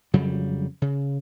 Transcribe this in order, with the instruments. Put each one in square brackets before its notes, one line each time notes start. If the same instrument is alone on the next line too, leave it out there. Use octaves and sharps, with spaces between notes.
[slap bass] F2 C#3 F#3 G3
C#3